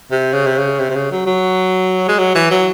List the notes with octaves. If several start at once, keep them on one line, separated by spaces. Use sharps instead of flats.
C3
C#3
C3
C#3
C3
C3
C#3
F#3
F#3
G#3
F#3
E3
F#3